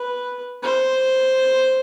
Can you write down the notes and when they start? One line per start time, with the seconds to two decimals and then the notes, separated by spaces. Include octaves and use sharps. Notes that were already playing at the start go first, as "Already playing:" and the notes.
Already playing: B4
0.63 C5